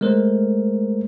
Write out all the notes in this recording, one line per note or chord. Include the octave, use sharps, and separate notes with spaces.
G#3 A3 A#4 C5